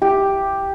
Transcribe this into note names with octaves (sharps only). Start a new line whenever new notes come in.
G4